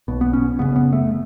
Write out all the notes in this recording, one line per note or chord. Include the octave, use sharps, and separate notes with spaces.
B1 B2
B3
C#4
F#1 F#2 C#3 B3
B3
A3